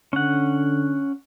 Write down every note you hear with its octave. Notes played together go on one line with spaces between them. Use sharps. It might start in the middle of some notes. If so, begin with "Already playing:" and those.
D3 C#4 F#5